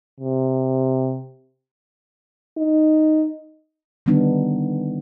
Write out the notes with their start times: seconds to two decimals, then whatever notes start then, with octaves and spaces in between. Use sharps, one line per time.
0.20 C3
2.57 D#4
4.06 D3 D#3 G3 B3 D4 D#4